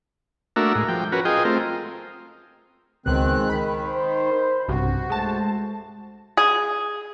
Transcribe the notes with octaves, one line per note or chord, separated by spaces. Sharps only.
A3 A#3 D4 F#4 A#4 E5
A2 G#3
F3 G5
C#4 F#4 A#4 B4
F4 G#4 D#5 G5
A3 C4 F4 A#4
C#2 B2 D#3 G#3 C4 F#6
D#3 B5
D#4 C5
B1 G2 C3 F#4
G2 G#3 A3 C5 A5
G#4